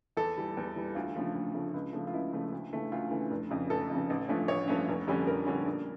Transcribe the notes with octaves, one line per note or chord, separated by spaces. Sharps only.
E2 A4
E3 G3
E2
E3 G3
D2 F4
C#3 F3 A3
D2
C#3 F3 A3
C#2
C#3 F3 A3
F4
C#2 E4
C#3 F3 A3
D2
C#3 E3 A3
D2 F4
C#3 E3 A3
F1
F2 C#3
F1 A4
F2 C#3
A1
G2 F3 A3 C#4
A1 C#5
G2 F3 A3 C#4
F1
F2 D3 G3 C#4
F1 A#4
F2 D3 G3 C#4
A#1